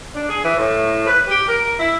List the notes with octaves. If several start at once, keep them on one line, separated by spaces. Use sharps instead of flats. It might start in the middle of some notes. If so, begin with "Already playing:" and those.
D4
G#4
E3
A2
B4
G4
A#4
E4